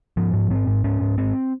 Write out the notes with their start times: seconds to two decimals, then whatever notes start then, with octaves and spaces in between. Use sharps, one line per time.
0.17 G#2 F3
0.33 G#2
0.50 G#2 C4
0.67 G#2
0.84 G#2 C#4
1.01 G#2
1.18 G#2 C4